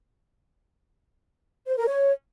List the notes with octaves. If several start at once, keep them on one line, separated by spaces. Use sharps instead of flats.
C5
A#4
C#5